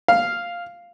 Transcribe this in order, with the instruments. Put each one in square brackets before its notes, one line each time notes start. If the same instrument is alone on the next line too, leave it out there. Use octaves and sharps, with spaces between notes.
[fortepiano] F5